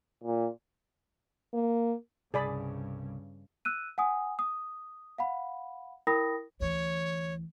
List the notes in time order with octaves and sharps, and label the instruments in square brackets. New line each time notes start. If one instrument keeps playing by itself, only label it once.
[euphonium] A#2
[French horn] A#3
[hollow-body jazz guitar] C2 [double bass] G2 C#3 [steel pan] G#4 D5 B5
[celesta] E6 F#6 D#7
F#5 G#5 D#6
D#6
F5 F#5 B5
E4 A#4 G5 B5 D#6 A#6
[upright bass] D2 E3 [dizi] C#5